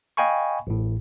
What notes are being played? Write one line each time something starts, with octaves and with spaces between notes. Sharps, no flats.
D#5 F5 G5 G#5 B5 C#6
A1 A2